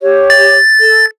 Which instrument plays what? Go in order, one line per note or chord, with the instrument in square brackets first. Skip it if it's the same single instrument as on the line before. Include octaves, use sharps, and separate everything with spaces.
[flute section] G4 C#5
[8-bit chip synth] A6
[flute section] A4